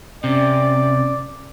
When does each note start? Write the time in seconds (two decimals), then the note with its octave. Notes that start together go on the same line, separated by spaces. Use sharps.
0.24 C3 C#4 D5